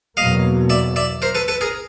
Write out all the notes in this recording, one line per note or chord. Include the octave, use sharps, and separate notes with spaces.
E2 B2 F#3 A#3 D#5 F5
D5 E5
D5 E5
A#4 C5
A4 B4
A4 B4
G#4 A#4